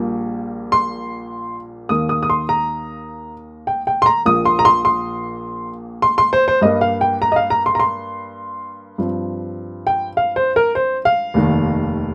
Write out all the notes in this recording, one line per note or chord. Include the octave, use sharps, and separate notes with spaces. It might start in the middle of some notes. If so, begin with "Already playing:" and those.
Already playing: A#1 A#2 G3 A#3
C6
D#2 D#3 A#3 D#6
D#6
D#6
C6
A#5
G5
G5
C6
A#5
A#1 A#2 F3 A#3 D#6
C6
A#5
C6
C6
C6
C6
C5
C5
G2 G3 A#3 D#5
F5
G5
A#5
D#5
F5
A#5
C6
A#5
C6
G2 F3 C4
G5
F5
C5
A#4
C5
F5
F1 D#2 D#3